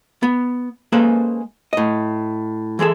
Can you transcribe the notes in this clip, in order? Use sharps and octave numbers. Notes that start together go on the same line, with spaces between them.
B3
G#3 A#3 C#4 A4 B4 C5
A2 D#5
E3 G#3 G#4 A4